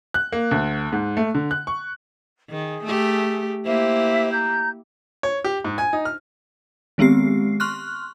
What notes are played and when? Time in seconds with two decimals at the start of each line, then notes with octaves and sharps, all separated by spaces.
0.14 F#6
0.32 A#3
0.51 D2
0.92 G#2
1.17 A3
1.34 D3
1.51 F#6
1.67 C#6
2.49 D#3 G#4
2.84 A3 G4
3.65 A#3 E4 G4 C5 E5
4.33 A#5 G6
5.23 C#5
5.44 G4
5.64 G#2
5.78 G#5
5.93 D#4
6.05 F6
6.98 D#3 G#3 B3 C4 G4 C7
7.60 C6 C#6 F6 F#6